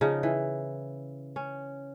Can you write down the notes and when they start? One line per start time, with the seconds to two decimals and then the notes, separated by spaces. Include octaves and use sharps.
0.01 C#3 F3 D#4
0.23 E3
1.36 C#4